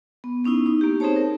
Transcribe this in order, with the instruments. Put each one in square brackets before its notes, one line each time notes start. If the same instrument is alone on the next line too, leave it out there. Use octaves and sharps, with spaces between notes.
[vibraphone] B3
B3 C#4 D#4 E4
D#4
A#3 G4
C4 D#4 G#4 C5 C#5 A5
A#4